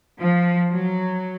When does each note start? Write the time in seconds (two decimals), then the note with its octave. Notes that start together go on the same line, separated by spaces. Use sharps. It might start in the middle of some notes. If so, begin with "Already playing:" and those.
0.20 F3
0.71 F#3